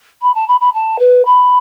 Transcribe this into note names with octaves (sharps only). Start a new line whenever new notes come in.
B5
A5
B5
B5
A5
B4
B5